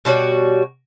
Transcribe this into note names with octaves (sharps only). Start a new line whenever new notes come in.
B2 G3 F#4 C#5